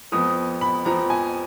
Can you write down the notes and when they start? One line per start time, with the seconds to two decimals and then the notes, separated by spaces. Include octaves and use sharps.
0.12 F2 F3 B3 D#6
0.61 B5
0.85 F2 F3 B3 A#5
1.10 G#5